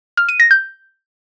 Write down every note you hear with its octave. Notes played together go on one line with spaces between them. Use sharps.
F6
D#7
A#6
G6